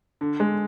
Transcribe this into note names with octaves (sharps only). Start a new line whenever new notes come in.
D3
G#3